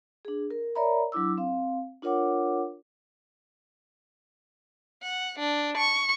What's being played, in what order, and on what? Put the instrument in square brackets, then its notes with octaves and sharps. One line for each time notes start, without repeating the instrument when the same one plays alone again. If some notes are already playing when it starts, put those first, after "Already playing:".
[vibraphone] D4 G#4
A#4
A#4 C#5 D5 E5 A#5 B5
F#3 D4 E4 D6 E6
C4 F5
D4 F4 A#4 C#5 F#5 D6
[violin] F#5
D4
C#6